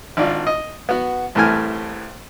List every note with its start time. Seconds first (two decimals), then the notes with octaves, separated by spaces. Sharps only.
0.17 G#1 D4 F4
0.47 D#5
0.89 B3 F#4
1.35 C2 A2 E3 A3 G#5 F6